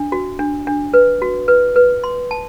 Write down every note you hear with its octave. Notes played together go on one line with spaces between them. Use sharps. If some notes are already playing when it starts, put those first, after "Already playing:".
Already playing: D4
F#4
D4
D4
B4
F#4
B4
B4
C6
A5